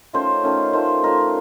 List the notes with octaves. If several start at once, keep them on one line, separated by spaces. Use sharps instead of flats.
D#3 A3 C#4 F4 C5
D#3 A3 C#4 F4
D#3 A3 C#4 F4 C5
D#3 A3 C#4 F4 A#4